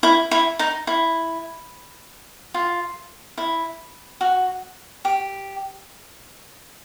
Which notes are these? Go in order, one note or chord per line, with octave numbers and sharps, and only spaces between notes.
E4
E4
D#4
E4
F4
E4
F#4
G4